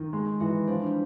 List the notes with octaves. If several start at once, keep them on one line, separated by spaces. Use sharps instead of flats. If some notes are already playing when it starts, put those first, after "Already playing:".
Already playing: D#3 D#4 F4
G#3
E3 F#4
F3 D4
G3